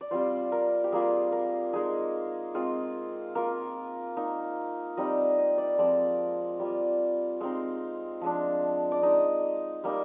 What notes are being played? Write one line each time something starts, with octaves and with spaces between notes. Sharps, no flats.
D5
G3 C4 F4 C5
A#4
G4
G3 A#3 F4 G#4
A#4
G#3 D#4 G#4
G#3 C4 F4
A#3 F4 A#4
A#3 D#4
G3 C4 D#4 D#5
F5
D#5
D5
F3 G#3 C4 D5
G3 A#3 F4
G#3 C4 D#4 F5
F3 G#3 D4
D5
G#3 D#4 D#5
G3 A#3 D#4